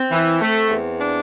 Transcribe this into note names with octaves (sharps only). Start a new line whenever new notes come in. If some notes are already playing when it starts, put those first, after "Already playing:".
Already playing: C4
E3
A3
E2
D4